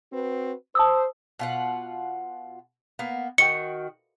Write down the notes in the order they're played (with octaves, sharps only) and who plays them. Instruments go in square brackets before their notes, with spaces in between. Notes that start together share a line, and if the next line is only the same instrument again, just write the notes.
[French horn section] C4 F#4 B4
[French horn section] C5 [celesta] A5 D#6 E6
[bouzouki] B2 F4 F#5
A#3 B3
[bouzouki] D#3 F#4 G5 [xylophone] C#7